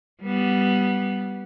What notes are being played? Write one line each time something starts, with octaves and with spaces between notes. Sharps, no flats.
G3 B3